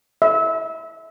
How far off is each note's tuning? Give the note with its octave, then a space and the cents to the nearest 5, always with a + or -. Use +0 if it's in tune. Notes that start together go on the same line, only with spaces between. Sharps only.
E5 -25